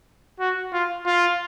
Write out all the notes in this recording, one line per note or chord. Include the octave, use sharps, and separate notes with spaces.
F#4
F4
F4